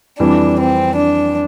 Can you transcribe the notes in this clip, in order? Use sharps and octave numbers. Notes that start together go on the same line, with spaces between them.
F2 E3 G3 D4
C4
D4